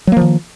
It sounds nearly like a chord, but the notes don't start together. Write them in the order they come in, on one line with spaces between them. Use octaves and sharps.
F#3 A#3 F3 D#3